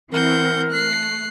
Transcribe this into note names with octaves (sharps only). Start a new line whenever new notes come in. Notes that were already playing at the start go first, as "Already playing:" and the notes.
E3 C4 A#4 F#5 G6
A3 F#6 C7